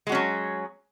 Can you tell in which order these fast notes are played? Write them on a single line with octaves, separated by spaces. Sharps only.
G#3 F#4 C#4 F#3